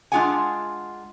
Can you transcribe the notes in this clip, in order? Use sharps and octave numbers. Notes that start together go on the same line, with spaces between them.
G#3 D4 F4 G#4 F#5 G#5